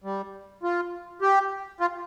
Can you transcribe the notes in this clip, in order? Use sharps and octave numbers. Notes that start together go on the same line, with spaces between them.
G3
F4
G4
F4